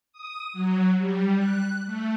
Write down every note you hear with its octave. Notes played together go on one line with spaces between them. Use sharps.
D#6
F#3
G3
F#6
A3